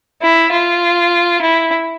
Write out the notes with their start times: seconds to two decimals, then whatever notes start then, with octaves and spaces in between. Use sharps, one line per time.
0.22 E4
0.52 F4
1.41 E4